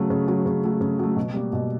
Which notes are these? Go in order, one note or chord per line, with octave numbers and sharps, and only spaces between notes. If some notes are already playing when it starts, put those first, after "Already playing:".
Already playing: C#3 F#3 A3
C#3
F#3 A3
C#3
F#3 A3
C#3
F#3 A3
B2
G3 A#3
B2